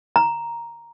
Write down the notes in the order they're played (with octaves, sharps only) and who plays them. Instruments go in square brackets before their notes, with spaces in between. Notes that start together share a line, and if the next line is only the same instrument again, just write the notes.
[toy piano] A#5